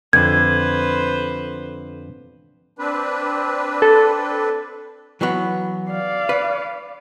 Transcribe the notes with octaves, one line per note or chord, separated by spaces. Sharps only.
F2 D3 B4 C5 G#6
C4 D4 B4
A4
E3 F#3 B3
D5 F5
B4